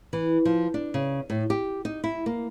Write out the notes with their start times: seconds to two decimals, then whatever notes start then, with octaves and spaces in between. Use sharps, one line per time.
0.13 E3
0.45 F3
0.74 D4
0.94 C#3
1.30 A2
1.50 G4
1.85 D#4
2.04 E4
2.26 A#3